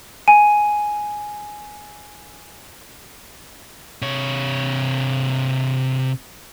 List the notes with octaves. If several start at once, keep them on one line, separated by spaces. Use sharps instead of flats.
G#5 D#7
C3 C#5